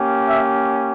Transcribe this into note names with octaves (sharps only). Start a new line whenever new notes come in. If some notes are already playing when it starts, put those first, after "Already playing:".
Already playing: A#3 C#4 G4
E5